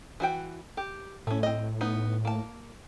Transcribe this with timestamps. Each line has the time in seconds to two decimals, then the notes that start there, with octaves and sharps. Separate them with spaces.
0.20 E3 F#4 G5
0.77 G4
1.27 A2 A3 C#4
1.43 C4 D#5
1.81 B3 D#4
2.25 A#3 A5